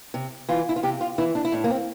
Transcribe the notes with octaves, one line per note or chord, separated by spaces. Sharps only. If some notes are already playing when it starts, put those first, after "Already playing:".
C3
E3 F4
E4
F4
C3 G4
F4
E3 E4
D4
E4
A2 D4
A#3
C4